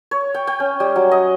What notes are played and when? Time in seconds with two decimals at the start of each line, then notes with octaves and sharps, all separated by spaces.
0.11 C#5
0.34 G5
0.47 G5
0.60 C#4
0.80 G3
0.96 F#3
1.11 D#5